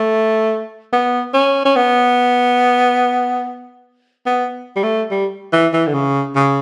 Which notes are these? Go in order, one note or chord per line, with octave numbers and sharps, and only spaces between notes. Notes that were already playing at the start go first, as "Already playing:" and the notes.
Already playing: A3
B3
C#4
C#4
B3
B3
G3
A3
G3
E3
E3
D3
C#3
C#3